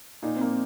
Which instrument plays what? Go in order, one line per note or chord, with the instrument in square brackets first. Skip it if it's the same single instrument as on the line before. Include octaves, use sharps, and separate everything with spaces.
[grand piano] A#2 [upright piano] D#4
[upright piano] C4
[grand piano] A#3
[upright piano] C4